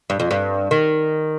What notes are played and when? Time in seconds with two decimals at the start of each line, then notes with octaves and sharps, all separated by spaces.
0.10 G2
0.20 F2
0.31 G2
0.71 D#3